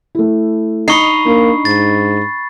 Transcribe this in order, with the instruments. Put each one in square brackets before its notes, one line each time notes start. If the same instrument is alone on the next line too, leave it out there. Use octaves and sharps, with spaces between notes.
[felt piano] A3 E4
[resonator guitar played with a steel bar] D#4 [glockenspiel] B5 C#6 C7
[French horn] A#3 [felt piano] D4
[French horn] G#2 [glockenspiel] A6